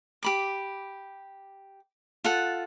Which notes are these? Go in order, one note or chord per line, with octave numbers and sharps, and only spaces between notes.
G4 B5 D6
F4 A4 F#5